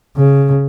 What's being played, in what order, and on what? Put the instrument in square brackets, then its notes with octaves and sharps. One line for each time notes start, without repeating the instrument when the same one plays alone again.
[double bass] C#3